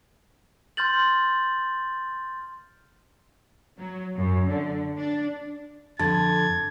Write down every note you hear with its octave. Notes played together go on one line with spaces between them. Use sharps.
C6 F6 G6 A6 F#7
F#3
F#2
D3
D4
F2 D3 A5 G#6 A6